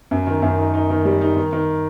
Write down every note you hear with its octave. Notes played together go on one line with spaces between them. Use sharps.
F#2
D#3
F#2
D#4
D#4
D#3
G3
D#4
D#3
D#3